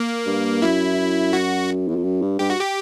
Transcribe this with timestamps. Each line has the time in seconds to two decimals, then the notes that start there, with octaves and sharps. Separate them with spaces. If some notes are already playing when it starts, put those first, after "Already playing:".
Already playing: A#3
0.26 G2
0.62 F#2 E4
1.33 F#4
1.88 E2
1.96 F2
2.04 F#2
2.22 G2
2.39 G2 G4
2.50 F#4
2.60 G4